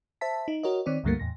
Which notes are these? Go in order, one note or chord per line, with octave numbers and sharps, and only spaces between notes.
C5 E5 A5 B6
D#4
F#4 A#4 C#5 D#5
D#3 C4 C#5 D5
C#2 G2 D3 G3 A3 A#3
E2 A2 A#6